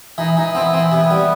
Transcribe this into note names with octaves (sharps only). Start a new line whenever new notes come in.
E3 D#4
E3 D#4
B3 C4
E3 C4
C3 B3
G3